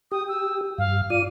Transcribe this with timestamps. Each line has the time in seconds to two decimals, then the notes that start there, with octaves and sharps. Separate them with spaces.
0.12 G4 D#6
0.28 E6
0.78 G2 F5
1.10 F4 D5 D#7